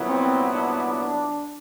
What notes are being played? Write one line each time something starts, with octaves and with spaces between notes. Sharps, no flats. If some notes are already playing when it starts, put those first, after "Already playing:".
Already playing: C2 A#2 F#3 B3 E4
C4
D4